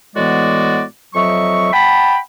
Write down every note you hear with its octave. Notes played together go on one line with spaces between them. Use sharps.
A2 E3 G#3 B3 F#4 D5
F2 F#3 D#5 E5 C#6
F#5 G5 A5 B5